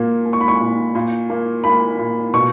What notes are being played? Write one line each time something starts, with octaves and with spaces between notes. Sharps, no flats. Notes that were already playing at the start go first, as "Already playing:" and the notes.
Already playing: A#2 A#3
A#3
C#6
B5
C#6
A#2
A#2
A#3
A#3 B5
A#2
B2 C#6